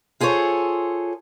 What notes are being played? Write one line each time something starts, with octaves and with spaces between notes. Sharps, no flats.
F4 G#4 A4 C5 C#5